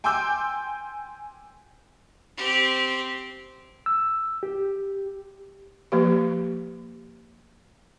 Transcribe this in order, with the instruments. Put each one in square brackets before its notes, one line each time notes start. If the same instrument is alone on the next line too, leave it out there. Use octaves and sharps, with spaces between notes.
[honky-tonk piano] G5 G#5 C6 D6 E6 G6
[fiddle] C4 G4
[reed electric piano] E6
G4
[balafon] F3 A#3 G4